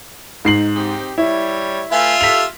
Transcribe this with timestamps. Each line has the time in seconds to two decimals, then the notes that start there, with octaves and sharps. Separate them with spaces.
0.45 G#2 D#4 C7 F#7
0.75 C4 D#4 G4
1.18 G3 E4 C#5
1.92 A3 F4 B4 E5 G#5
2.21 G4 A4 B6 F7